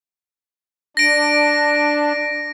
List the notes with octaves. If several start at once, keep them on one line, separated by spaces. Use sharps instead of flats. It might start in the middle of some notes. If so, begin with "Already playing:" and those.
D4 A#6 D7